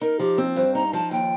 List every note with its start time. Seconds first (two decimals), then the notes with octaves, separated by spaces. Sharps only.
0.01 D#4 A#4
0.19 F3 G4
0.38 C4
0.56 G2 C5
0.75 D#4 A#5
0.93 F3 A5
1.11 D#2 G5